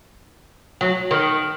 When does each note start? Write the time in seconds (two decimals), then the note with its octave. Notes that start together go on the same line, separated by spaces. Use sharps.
0.81 F#3
1.11 D#3